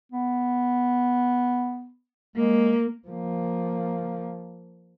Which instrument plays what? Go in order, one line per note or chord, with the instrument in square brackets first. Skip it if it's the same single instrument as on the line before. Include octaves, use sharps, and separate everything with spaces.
[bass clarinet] B3
[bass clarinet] G#3 [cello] A#3
[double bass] F3 A#3